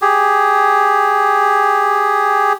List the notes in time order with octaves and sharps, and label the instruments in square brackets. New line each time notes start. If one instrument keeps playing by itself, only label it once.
[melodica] G4 G#4